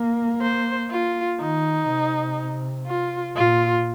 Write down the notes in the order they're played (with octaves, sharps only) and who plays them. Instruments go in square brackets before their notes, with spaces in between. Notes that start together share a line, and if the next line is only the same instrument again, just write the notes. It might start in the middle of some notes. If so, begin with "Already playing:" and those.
Already playing: [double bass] A#3
[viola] C5
F4
[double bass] D#3 [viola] D#4
[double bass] C3
[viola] F4
[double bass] A#2 [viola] F4